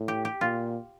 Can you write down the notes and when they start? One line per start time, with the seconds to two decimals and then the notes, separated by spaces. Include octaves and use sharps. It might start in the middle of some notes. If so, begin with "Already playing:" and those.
Already playing: A2
0.08 G4
0.25 G4
0.41 A#2 F4